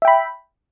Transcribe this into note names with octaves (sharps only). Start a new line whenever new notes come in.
E5 G5 B5